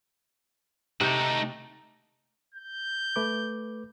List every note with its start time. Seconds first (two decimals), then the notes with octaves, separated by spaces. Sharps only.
1.01 C3 A3 D#4 F#4 G5
2.54 G6
3.16 A3 B4 D6